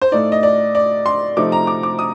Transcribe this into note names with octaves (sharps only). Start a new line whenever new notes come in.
C5
A2 A3 D#4 D5
D#5
D5
D5
C6
C3 F3 A3 D#4 D6
A#5
D6
D6
D#6